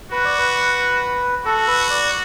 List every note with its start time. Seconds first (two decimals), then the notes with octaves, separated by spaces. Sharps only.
0.11 F#4 B4
0.25 D5
0.38 B4
1.45 F#4 A4
1.68 B4
1.90 D5